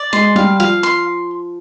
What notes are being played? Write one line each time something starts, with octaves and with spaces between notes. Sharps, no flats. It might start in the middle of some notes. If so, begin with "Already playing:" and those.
Already playing: D5
G#3 C6
G3 F5
F3 F5
C6